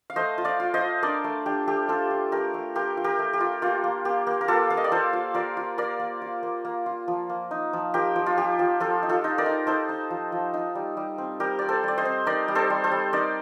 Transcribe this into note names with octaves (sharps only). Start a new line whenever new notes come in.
F5
A3 C5 D#5
F4
D5 F5
F4
C5 D#5
F4
D4 A#4 D5
A3
D4 G4
A3 G4
A3 F4 A4
F4
A3 G4 A#4
A3
F4 G4 A#4
F4
G4 A#4
A3
G4
F4
A#3 F4
A#3
A#3 G4
A#3
A#4
A#3 F4 A4
A#3 F5
D#5
D5
F4 A4 C5
F4
F4 A#4 D5
F4
A#3 A#4 D5
A#3
F4
A#3
A#3
F4
F3
A#3
D#4
F3
F3 G4 A#4
F3
F4
F3 G4
F3
F3 F4 A4
D#4
F4 A4
D#4
A#4 D5
D#4
D#4 A4 C5
D#4
F3
F3
D#4
G3
G3
C4
G3 G4 A#4
C4 D5
A4 C5
G3 D5
C5 D#5
C4
D#4 A#4 D5
G3
A4 C5
G3
A4 C5
G3
D#4 A#4 D5